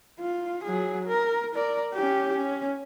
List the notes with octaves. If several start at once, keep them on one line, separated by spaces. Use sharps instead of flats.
F4
F#3 G#4
A#4
A#4 D5
C#4 G4
C#4